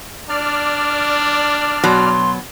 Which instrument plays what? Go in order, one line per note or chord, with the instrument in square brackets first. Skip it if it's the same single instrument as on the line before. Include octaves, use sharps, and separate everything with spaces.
[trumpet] D4 [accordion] D5 F6
[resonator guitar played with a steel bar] B2 F#3 [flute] C6